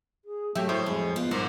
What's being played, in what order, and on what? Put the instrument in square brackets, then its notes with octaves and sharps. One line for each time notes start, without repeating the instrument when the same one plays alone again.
[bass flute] G#4
[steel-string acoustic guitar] F#3 [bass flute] A3 [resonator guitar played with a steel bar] G4 E5
[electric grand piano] A2 [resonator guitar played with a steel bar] C5
[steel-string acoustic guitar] F2 [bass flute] G#3
[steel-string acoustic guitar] B3 F4
[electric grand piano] B1 G#2 [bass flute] D#4 [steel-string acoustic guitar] A#4 C5